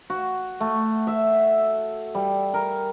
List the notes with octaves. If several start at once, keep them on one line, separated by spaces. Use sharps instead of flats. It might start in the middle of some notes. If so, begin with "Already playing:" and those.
F#4
A3
E5
G3
A#4